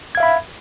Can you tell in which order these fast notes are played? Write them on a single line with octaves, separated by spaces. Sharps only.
G#6 F5 E5 B5